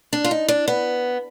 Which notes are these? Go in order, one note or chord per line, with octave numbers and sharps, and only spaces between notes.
D4
F4
D#4
D4
B3